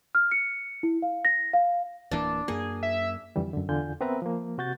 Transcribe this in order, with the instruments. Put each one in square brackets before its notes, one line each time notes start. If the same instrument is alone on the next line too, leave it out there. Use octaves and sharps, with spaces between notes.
[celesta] F6
C#7
E4
F5
A#6
F5
[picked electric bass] D1 E3 A#3 [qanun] D4
[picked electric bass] F#2 A#3 [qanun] G#4
[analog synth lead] E5
[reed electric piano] F2 D3 E3 G3
F#2 D3
E2 D3 F4 G#5 G6
B3 C4 A#4 B4 E5 A#5
F3 A#3
C3 F#4 G6 A6